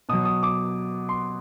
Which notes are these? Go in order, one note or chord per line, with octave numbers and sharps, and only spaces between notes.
B2 F#3 D#6
D#6
D6
C6